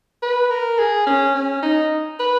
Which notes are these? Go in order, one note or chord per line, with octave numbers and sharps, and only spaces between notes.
B4
A#4
G#4
C#4
C#4
D#4
B4